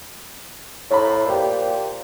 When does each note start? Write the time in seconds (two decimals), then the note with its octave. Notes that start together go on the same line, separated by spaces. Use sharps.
0.91 A2 C#5 A#5 B5
1.25 A#2 G4 C5